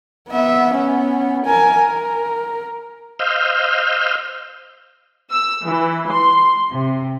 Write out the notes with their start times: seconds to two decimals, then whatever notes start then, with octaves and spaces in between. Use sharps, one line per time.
0.29 B3 E5
0.75 B3 C#4
1.45 A#4 G#5
1.80 A#4
3.19 C5 D#5 F5 E6 F6 G6
5.30 E6
5.65 E3
6.10 C6
6.72 C3